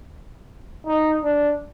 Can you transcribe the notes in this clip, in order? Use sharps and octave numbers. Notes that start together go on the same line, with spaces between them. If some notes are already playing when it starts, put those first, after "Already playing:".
D#4
D4